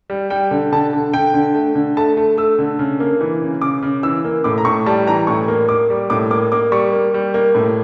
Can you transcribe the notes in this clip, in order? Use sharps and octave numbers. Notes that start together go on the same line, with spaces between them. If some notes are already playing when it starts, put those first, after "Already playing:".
G3
G3 G5
D3
D3 A5
D3
D3 G5
D3
A3
D3
A3 A5
A3
A3 E6
D3
C#3
A#3
E3
C#3
C#3 D6
C#3
E3 E6
A#3
A2 D6
A#5
A2 C#6
G3 A5
E3 A#5
A2 C#6
A#3
A#3 D6
G3
A2 D6
A#3 D6
A#3 D6
G3 C#6
A#3
G3
A#3
A2